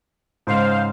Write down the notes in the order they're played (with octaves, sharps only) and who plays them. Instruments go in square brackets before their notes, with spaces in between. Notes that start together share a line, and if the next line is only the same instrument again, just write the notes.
[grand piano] G#2 C#3 G#3 [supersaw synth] C5 F5